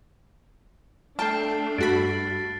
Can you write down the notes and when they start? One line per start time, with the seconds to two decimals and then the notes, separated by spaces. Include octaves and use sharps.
1.19 A3 D4 G5 A5 F6 C7
1.78 G2 F#4 B5 A6 D7